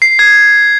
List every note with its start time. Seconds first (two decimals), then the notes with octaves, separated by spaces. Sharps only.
0.02 C7
0.19 G#6